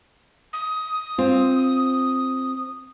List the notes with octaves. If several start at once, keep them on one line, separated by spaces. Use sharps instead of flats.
D#6
C4 F4